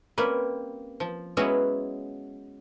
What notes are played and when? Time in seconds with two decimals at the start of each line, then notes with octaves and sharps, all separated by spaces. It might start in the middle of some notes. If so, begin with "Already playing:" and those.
0.18 G3 A#3 C4 C#4 B4
1.00 F3
1.37 F#3 G#3 B3 C#4 E4 F#4